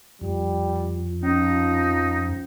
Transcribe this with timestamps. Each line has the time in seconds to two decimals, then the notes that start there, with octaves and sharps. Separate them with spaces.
0.21 F2 G3
1.23 F3 C#4 D#4